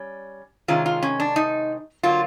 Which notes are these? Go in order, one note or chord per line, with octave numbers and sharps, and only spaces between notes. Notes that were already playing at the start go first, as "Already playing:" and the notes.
Already playing: G3 C#4
C3 D#3 G#3 C#4 F4
F4
C#4
D4
D#4
D3 F#3 A#3 F4